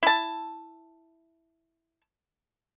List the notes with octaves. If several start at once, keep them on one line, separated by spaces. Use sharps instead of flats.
E4 A5